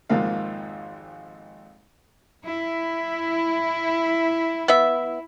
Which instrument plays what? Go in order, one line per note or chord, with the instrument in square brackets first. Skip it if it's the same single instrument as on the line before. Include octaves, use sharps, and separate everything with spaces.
[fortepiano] G#1 F2 G#2 A#3 F5
[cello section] E4
[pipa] B3 E5